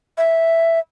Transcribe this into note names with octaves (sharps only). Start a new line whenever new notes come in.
E5